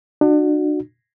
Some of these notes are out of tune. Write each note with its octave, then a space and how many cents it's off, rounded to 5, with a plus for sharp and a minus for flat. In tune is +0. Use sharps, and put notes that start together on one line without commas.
D4 +35 F#4 -10